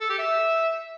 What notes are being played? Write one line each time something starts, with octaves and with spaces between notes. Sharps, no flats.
A4
G4
E5